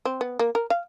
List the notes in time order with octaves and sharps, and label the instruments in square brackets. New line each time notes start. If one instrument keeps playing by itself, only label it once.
[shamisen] C4
B3
A#3
A#4
F5